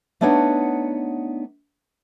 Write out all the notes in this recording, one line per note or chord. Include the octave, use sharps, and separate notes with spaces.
A3 B3 D4 D#4 C#5 F#5